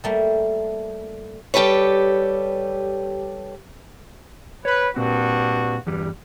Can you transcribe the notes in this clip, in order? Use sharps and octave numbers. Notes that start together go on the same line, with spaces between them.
G3 A3 A#3
G3 G4 A4 B4 C#5
B4 C#5
G2 A#2 C4 F#4
E2 G2 G3